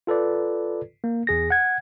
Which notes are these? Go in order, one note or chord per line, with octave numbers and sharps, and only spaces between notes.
F4 A4 B4 D5
A#3
E2 G#4 A#6
F#5 G#6